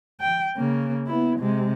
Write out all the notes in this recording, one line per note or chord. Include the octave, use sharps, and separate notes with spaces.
G5
C#3 A#3
B3 E4
C3 G#3